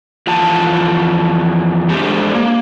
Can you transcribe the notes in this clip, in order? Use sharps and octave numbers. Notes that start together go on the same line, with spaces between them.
F2 E3 F4 F#5 A5
G#3 A3 D4 G4 C5 D5
A#3